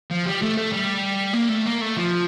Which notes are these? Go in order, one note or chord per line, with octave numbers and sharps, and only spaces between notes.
F3
G3
A3
A3
G3
A#3
A3
A#3
A3
F3